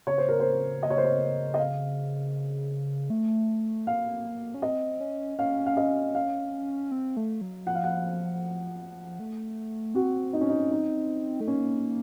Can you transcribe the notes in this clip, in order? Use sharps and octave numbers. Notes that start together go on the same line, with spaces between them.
C#3 C#5
C5
A#4
C5
D#5
C#5
C5
C#5
D#5
F5
A3
A#3 F5
C#4
C4 D#5
C#4
C#4 F5
F5
D#5
F5
C4
A3
F#3
F3 F#5
F5
F#5
A3
C4 F#4
D#4
C#4
D#4
D#4
A3
A#3 C#4